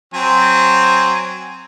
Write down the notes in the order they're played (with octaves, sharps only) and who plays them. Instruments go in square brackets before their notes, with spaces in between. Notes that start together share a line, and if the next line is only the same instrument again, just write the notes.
[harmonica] F#3 C4 G#5